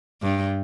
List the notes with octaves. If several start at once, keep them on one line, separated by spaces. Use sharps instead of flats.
G2